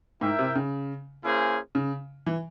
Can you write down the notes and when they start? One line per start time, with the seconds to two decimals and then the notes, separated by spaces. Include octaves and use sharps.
0.21 G#2 E4 A#4 E5 G5
0.39 C3
0.55 C#3
1.24 A#3 C#4 E4 G#4 C5
1.75 C#3
2.26 E3